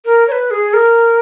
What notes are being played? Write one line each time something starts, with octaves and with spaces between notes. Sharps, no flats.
A#4
C#5
B4
G#4
A#4